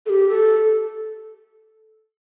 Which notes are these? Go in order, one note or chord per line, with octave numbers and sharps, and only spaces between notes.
A4
G4
A4